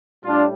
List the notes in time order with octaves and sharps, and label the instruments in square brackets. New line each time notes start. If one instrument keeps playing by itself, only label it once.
[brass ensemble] A2 G3 D4 F4